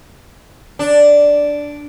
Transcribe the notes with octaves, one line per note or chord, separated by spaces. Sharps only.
D4